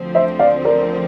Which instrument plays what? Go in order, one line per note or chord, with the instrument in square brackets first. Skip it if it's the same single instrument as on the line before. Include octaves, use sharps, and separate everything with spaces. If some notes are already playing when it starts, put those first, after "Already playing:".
Already playing: [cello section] D2 D3 F3 C4
[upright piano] C5 E5
D5 F5
A#4 D5